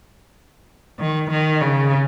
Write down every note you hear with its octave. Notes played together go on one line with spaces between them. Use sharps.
D#3
D#3
C#3